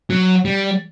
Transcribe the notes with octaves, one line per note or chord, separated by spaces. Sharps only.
F#3
G3